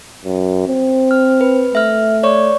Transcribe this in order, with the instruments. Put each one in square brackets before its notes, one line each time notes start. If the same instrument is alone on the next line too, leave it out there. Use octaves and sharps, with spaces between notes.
[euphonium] F#2
C4
[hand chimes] F6
B4
[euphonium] A3 [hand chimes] E5 F6
[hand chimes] C#5 D5 C#6